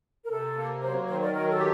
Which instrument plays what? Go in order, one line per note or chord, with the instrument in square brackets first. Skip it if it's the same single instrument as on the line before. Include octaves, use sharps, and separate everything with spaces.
[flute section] A#4
[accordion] C3 [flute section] A4
[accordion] A#3
[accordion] F#3 [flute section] C5
[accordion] D#3 [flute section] C5
[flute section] A#4 D5
[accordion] F#3 [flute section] A#4
[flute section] A4
[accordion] G4